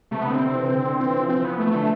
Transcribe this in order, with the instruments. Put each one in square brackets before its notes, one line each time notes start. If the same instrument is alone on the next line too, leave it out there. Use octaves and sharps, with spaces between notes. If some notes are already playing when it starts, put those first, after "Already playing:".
[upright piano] C3 [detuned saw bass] A3
[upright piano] D3 [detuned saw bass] B3
[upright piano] C3 [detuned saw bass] C4
[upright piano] D3
E3
D3
D3
[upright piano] E3 [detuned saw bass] C4
[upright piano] F3
[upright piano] E3 [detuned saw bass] C4
[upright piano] F3 [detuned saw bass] B3
[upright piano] E3 [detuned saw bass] A3
[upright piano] D3